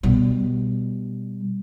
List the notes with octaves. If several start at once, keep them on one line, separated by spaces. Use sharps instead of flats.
B2 G3